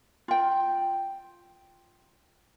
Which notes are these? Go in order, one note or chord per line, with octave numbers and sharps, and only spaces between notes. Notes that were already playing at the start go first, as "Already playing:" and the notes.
F4 G5